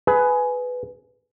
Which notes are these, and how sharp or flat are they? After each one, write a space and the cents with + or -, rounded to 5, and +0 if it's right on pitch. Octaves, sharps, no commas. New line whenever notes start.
G#4 +15 B4 +10